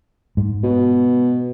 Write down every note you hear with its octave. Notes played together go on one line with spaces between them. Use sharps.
G#2
B2